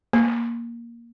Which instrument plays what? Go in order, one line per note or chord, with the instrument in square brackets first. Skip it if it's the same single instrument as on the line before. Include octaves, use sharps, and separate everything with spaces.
[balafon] A#3